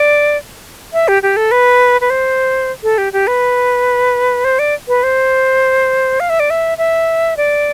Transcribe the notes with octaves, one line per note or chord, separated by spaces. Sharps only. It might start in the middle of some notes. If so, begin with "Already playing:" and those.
Already playing: D5
E5
G4
G4
A4
B4
B4
C5
A4
G4
G4
B4
C5
D5
B4
C5
F5
E5
D5
E5
E5
D5